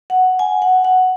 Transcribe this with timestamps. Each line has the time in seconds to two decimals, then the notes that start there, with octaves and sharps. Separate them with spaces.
0.10 F#5
0.39 G#5
0.62 F#5
0.85 F#5